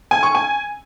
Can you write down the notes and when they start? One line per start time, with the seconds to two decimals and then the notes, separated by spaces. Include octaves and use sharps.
0.11 G#5
0.23 C#6
0.35 G#5